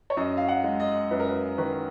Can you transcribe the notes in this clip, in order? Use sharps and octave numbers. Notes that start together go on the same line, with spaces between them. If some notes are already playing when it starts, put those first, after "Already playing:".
C#5
F#2 D#5
F5
F#5
G#3
D#5
F#2 B4
A#4
B4
D#3 B4